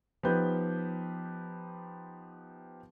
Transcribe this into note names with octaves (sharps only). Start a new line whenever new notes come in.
F3 B3 D#4 G4 B4 G6